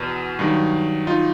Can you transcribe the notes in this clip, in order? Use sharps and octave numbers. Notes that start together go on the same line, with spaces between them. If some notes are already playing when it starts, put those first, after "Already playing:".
Already playing: E2 B2
G2 D#3 F#3
D#4 F4